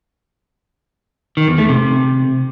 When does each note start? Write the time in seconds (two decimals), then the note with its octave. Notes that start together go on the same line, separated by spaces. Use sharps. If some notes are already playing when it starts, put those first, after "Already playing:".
1.37 D#3
1.48 E2
1.58 A3
1.69 C3